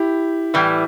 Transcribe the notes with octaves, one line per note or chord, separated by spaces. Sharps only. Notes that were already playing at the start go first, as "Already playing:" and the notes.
Already playing: E4 G4
A2 E3 G3